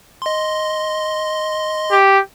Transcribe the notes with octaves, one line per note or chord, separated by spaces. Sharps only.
D#5 C6
G4